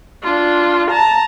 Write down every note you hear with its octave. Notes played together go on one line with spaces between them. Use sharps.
D4 F4
A5 A#5